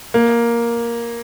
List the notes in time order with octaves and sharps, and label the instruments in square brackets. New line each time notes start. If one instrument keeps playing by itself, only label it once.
[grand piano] A#3